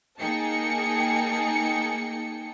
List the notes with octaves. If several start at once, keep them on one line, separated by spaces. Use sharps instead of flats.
A#3 D#4 G#4 G5 A5 C#7